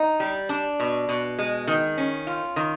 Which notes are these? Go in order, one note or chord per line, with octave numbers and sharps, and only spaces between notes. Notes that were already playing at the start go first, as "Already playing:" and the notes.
Already playing: D#4
G3
D4
B2
B2
G#3
D#3
C#4
F4
D#3